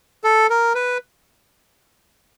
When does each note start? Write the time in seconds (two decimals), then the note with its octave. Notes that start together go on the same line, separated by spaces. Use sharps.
0.24 A4
0.50 A#4
0.75 B4